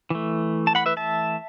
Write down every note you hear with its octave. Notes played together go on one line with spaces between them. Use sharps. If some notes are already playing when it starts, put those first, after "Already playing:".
E3 A3
A5
F#5 B5
B4 E5
E5 A5